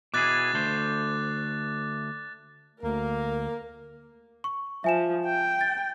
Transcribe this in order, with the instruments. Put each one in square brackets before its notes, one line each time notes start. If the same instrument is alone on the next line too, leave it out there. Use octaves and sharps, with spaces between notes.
[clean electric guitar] B2 E4 G#4 [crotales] D6 F#6 A6
[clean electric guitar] D2 A3 C5
[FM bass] D2 [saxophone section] A#3 [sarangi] A#4
[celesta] C#6
[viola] F3 [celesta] E5 G#5 E7
[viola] G5
[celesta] A6